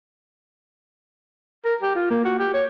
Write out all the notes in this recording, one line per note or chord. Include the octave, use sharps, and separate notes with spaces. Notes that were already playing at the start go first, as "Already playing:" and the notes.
A#4
G4
F4
A#3
F#4
G4
C#5